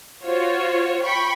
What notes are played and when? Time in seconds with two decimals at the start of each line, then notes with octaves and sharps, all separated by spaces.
0.24 F4 F#4 C5 C#5
1.03 G5 B5 C#6